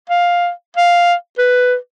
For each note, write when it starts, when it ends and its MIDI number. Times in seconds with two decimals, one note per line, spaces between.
0.10 0.50 77
0.76 1.14 77
1.38 1.76 71